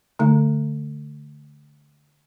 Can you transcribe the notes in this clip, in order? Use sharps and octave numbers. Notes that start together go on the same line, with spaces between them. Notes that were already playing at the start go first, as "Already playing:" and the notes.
D3 A3